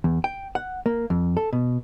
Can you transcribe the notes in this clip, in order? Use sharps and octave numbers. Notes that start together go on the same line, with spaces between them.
E2
G5
F#5
A#3
F2
A4
B2